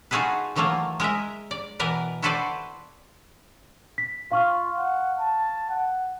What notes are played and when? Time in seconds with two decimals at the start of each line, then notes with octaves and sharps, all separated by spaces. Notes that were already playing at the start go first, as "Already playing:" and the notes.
0.11 D#4 F4 F#4 G#4 A4 B4
0.56 D#3 E3 F#3 A3 A#3 F4
1.00 G#3 A#4 D#5 E5
1.51 D5
1.79 B2 E3 A#4 B4 D5
2.22 E4 F#4 A4 B4 C5 D5
3.98 B6
4.31 F4 F5 C#6 F6
4.78 F#5
5.19 A5
5.70 F#5